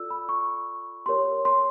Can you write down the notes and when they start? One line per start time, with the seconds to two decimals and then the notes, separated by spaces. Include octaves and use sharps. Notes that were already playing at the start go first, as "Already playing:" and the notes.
Already playing: F4 A4 D5 E6
0.10 B5
0.29 C#6
1.06 G4 A#4 C#5 C6
1.45 C6